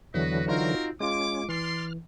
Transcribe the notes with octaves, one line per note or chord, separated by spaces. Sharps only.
E2 D3 E3 F#3 F#4 B4 D#5
C4 D#4 F4 F#4 A#4
G#3 C#4 F4 D6
E3 D5 C6 F6